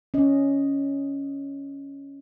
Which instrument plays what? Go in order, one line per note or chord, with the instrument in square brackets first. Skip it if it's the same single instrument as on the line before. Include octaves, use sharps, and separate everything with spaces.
[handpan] C#4 D#5